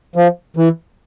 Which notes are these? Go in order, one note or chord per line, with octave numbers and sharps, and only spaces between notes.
F3
E3